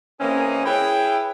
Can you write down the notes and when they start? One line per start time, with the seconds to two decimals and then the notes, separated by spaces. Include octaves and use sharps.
0.20 E3 A#3 C4 C#4 G#4 D#5
0.66 E4 G#4 B4 C#5 E5 G5